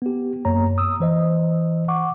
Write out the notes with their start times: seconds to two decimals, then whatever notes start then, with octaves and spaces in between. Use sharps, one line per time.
0.02 B3 G4
0.45 F#2 A#3 C#5 A#5
0.78 D#6 E6
1.00 E3 C5 D#5
1.88 F#5 C#6 D6